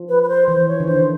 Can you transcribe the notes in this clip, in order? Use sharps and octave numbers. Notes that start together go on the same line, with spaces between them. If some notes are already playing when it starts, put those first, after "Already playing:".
Already playing: F3
B4
B4
C5
E3 C5
C#5
D3
D#3 C5